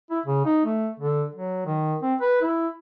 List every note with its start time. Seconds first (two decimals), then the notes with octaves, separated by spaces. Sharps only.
0.11 E4
0.26 C#3
0.45 D#4
0.65 A3
0.99 D3
1.35 F#3
1.66 D#3
2.02 C4
2.21 B4
2.42 E4